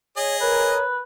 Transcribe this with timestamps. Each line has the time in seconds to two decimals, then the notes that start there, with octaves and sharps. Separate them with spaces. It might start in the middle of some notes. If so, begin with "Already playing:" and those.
0.17 G#4 C#5 D#5
0.41 A#4 B4 C#5